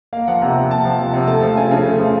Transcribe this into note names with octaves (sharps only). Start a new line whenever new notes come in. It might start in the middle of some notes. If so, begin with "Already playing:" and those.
A#3 F5
F3 F#5
C3 A#5
C3
A#3 A5
F3
C3
C3
A3 A5
F3
C#3 G#5
C#3
A3
F3